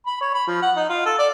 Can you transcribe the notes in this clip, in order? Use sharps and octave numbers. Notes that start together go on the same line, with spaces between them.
B5
C#5
B5
F3
F#5
D#4
F4
A4
D5